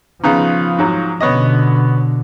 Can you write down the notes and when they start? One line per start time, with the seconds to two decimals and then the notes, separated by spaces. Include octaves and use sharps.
0.24 C#3 F3 B3 D#4
0.78 G#2 F#3
1.20 B2 D3 B3 C#4 D#5